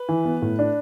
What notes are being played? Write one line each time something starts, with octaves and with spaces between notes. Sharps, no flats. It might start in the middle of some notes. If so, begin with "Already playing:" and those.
Already playing: B4
E3
B3
A2
D4